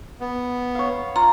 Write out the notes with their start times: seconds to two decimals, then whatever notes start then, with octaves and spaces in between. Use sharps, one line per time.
0.20 B3
0.75 C#5 F5
1.16 F4 A#5